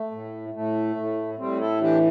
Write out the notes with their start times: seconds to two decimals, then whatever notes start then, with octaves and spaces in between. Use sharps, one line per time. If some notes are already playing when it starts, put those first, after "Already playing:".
Already playing: A3
0.11 A2
0.54 A2 A3
0.96 A2
1.39 A2 G3 C4
1.59 E4 A4
1.81 E3 D4 G4